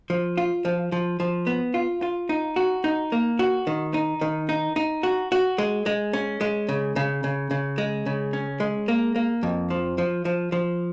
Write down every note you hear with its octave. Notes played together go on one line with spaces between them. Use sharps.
F3
F4
F3
F3
F3
B3
F4
F4
D#4
F#4
D#4
A#3
F#4
D#3
D#4
D#3
D#4
D#4
F#4
F#4
G#3
G#3
C#4
G#3
C#3
C#3
C#3
C#3
G#3
C#3
C#4
G#3
A#3
A#3
F2
F3
F3
F3
F3